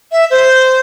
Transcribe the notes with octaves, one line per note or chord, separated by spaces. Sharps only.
E5
C5